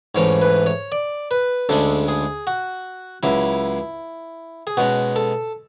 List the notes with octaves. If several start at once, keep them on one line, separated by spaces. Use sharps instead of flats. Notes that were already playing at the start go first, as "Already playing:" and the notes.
G#2 E3 A3 C#4 C#5
B4
C#5
D5
B4
D2 C#3 G#3 D4 A4
G#4
F#4
C#2 C#3 F#3 E4
G#4
B2 G#3 C#4 F#4
A4